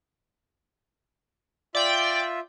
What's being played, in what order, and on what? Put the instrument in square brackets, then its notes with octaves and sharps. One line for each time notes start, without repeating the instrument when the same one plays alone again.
[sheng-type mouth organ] F4 E5 [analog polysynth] D5 G5